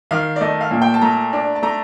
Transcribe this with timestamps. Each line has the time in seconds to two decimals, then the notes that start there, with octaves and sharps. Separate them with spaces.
0.11 D#3 F5
0.36 D5
0.41 A3 D#5
0.61 F5
0.71 A#2
0.82 G5
0.94 A5
1.01 A3 A#5
1.33 D4
1.56 A5
1.62 A3 A#5